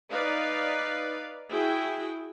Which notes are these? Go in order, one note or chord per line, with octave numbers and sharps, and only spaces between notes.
D#4 B4 D5 F5
E4 F#4 G#4 G5